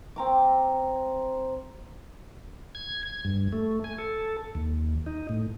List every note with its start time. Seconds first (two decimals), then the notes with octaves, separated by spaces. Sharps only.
0.16 C4 A#5 D6
2.75 G#6
3.03 G#6
3.25 G2
3.53 A3
3.84 G#5
3.98 A4
4.55 D#2
5.06 D#4
5.29 A2